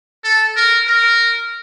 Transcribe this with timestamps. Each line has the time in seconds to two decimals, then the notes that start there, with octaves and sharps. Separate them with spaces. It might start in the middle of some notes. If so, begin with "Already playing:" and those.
0.24 A4
0.56 A#4
0.87 A#4